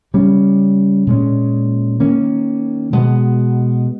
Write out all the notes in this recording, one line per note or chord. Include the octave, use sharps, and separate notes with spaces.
C#3 G3 C#4
A#2 G#3 C#4
D#3 A#3 C#4
B2 G#3 B3